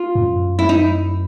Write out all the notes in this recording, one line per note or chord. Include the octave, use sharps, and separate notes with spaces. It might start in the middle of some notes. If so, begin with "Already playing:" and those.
Already playing: F4
F#2
E4
D#4